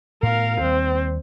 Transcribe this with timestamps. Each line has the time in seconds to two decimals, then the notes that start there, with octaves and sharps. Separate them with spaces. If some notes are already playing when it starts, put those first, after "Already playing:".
0.23 A2 B3 A#4 F5
0.61 D#2 G3 C4